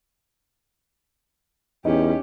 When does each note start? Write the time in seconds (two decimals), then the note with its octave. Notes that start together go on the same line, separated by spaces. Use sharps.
1.85 E2 C#4 D#4 G4